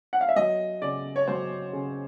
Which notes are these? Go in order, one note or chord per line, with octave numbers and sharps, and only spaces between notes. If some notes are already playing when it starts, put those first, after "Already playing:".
F#5
F5
E5
F#3 D#5
C#3 D5
C#5
F#3 C5
C#3